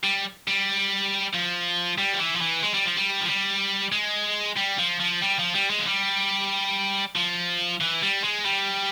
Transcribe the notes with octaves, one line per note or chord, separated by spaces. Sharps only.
G3
G3
F3
G3
F3
E3
F3
E3
G#3
G3
F3
G3
F3
G3
G#3
G3
F3
F3
G3
F3
G3
G#3
F3
G3
F3
E3
G3
G#3
G3